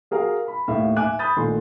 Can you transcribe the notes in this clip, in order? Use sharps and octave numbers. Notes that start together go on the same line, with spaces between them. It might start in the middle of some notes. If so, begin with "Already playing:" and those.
F#4 G#4 A#4 F5
B5
D#2 A2 E5 F5
E5 G#5 D6 F#6
B5 D#6 G6 A6
A#1 D#3 A3 G#5 C6